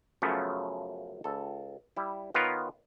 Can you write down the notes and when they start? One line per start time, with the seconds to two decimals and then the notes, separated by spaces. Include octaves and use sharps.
0.22 F#2 C#3 F3 A3 B3 C#4
1.24 C#2 A4
1.97 G3 E4
2.34 D#3 B3 F4 A#4 B4 C#5